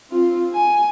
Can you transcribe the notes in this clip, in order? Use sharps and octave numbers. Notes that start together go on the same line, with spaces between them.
C4 F4
G#5